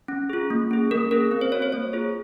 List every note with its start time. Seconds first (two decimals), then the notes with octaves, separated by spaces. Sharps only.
0.08 C#4
0.30 F4 G#4
0.50 A#3
0.71 C#4 G#4
0.91 A#3 A#4
1.11 C#4 G#4 A#4
1.31 C4
1.41 C5
1.52 F#4 C#5
1.62 C5
1.72 A#3 C#5
1.93 F4 G#4